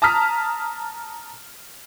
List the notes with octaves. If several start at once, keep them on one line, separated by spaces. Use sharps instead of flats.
A5 A#5 D#6 F6 B6